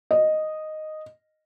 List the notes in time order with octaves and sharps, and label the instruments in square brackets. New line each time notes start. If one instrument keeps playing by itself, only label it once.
[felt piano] D#5